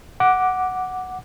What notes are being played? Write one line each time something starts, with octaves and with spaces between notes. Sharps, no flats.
F#5 D6